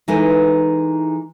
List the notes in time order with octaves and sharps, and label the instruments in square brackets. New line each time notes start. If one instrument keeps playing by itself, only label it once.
[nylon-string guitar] E3 G#3 D#4 E4 A4 B4